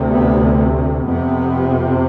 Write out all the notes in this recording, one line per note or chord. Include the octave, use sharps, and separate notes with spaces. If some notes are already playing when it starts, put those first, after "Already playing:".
Already playing: D2 C3
B3
F2 C3 B3